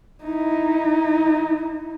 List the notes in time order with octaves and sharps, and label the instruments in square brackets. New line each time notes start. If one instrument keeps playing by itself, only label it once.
[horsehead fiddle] D#4 E4